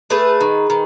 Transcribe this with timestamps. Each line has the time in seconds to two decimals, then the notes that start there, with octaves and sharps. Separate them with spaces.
0.10 A3 G#4 B4
0.41 D#3
0.70 D#3